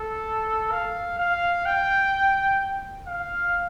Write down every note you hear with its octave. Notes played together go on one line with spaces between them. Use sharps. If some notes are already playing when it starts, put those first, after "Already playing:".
Already playing: A4
F5
F5
G5
F5